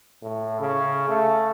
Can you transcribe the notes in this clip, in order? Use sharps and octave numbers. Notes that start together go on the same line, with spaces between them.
A2
C#3
A3